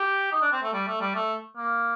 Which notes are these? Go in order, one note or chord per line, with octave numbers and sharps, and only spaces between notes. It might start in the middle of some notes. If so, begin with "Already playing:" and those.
Already playing: G4
D#4
D4
C4
A3
G3
A3
G3
A3
A#3